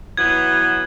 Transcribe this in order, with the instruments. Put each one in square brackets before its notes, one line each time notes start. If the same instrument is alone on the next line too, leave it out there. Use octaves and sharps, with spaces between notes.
[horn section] E3 F#3 B3 [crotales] G#6